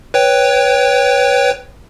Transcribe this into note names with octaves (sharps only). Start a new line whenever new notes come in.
B4 C#5 G5